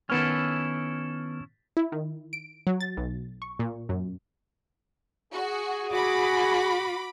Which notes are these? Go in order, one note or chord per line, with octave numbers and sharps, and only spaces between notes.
D#3 B3 C#4 E4 A4 F6
E4
D#3
D7
F#3
A6
B1
C#6
A#2
F#2
F#4 G#4
F#4 B5 D6